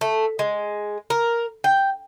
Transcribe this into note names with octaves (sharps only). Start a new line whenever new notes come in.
A3
G#3
A#4
G5